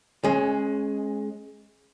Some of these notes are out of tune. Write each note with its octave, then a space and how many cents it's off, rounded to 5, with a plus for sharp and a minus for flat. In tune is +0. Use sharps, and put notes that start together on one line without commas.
G#3 +15 C#4 -20